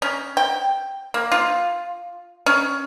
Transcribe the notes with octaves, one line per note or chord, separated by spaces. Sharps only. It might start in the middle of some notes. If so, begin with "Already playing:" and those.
C#4
G5
A#3
F4
C#4